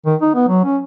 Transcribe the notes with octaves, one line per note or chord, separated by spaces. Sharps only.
D#3
D#4
B3
F#3
C#4